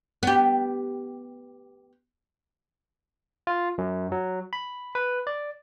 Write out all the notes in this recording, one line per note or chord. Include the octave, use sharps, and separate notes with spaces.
B3 G4
F4
F#2
F#3
B5
B4
D5